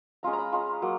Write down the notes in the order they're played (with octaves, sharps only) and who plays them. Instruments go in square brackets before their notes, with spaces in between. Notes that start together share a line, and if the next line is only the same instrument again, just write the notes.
[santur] G#3 C#4 F4 A#5
A#5
B5
G#3 C#4 F4 A#5
F#3 A#3